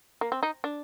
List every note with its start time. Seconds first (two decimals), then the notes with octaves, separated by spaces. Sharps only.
0.21 A#3
0.32 C4
0.43 D#4
0.64 D4